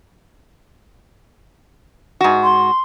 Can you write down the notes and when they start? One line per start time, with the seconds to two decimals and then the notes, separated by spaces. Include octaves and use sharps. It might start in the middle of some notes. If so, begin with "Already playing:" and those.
2.21 G#2 F#4
2.44 C6